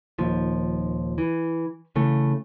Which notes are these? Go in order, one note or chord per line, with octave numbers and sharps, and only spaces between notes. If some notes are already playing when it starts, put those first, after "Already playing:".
D#1 D#2 F3
E3
C#3 E3 A3